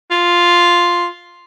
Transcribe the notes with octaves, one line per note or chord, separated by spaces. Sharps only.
F4